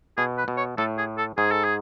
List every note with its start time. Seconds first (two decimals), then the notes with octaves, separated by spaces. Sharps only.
0.17 B2 G#4
0.38 B4
0.48 B2
0.57 C#5
0.78 A2 A4
0.98 G#4
1.18 A4
1.37 G#2 G#4
1.51 A4
1.64 G#4